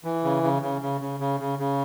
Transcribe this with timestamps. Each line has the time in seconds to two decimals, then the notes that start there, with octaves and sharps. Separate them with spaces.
0.04 E3
0.24 C#3
0.43 C#3
0.62 C#3
0.82 C#3
1.01 C#3
1.20 C#3
1.40 C#3
1.59 C#3